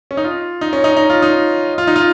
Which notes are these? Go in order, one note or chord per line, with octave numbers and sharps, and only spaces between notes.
C#4
D#4
F4
D#4
C#4
D#4
D#4
F4
D#4
F4
D#4
F4